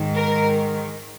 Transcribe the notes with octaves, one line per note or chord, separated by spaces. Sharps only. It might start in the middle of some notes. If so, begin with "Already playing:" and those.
Already playing: G#2 D#3
A#4